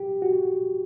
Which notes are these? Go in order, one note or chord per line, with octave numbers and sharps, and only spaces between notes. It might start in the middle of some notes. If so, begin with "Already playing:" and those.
Already playing: G4
F#4